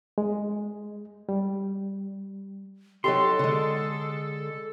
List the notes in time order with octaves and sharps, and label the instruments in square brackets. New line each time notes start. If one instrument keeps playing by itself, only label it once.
[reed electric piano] G#3
G3
[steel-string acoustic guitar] F#3 D#4 G4 [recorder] A4 [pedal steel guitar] C6
[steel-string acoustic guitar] D3 G#3